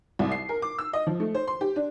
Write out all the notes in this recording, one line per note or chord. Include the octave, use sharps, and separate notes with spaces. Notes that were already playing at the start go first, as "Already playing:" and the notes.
C2
C7
A#4
D6
E6
D#5
F3
A3
C5
C6
G4
D4